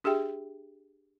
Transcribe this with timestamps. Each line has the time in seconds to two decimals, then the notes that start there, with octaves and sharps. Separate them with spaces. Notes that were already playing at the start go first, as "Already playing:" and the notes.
0.04 D4 G4 G#4 E5 G5